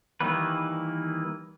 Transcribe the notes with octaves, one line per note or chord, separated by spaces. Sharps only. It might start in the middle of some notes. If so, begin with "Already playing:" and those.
D#3 E3 G3 A#3 B4